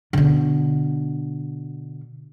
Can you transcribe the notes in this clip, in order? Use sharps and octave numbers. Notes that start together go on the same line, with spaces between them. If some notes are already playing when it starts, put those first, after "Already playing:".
B2 D3